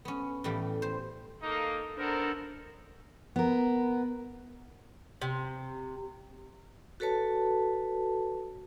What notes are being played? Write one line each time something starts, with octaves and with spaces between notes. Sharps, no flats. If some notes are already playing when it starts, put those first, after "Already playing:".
B3 C#4
A2 E3 G3 A4 F5
C5
A#3 D#4 A4
B3 D4 A4 A#4 C5
B3 A#4
C3
F#4 A4 B4 C#5 A5